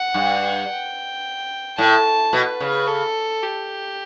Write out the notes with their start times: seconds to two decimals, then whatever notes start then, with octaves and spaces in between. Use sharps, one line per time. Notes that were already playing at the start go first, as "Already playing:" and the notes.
Already playing: F#5
0.14 G2
0.69 G5
1.78 A2 A5
2.33 B2 B4
2.60 C#3
2.87 A4
3.43 G4